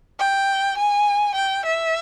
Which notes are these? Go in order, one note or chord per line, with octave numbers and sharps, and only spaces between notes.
G5
G#5
G5
E5